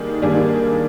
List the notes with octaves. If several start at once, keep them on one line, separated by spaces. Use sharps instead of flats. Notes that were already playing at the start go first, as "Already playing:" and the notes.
Already playing: D#3 G3 A#3 D4 G#4
D#3 G3 A#3 D4 G#4